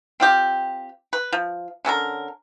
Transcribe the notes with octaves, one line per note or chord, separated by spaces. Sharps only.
C4 F4 G4
B4
F3
D3 C#4 A4 A#4